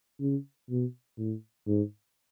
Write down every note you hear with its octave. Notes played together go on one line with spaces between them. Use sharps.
C#3
B2
A2
G#2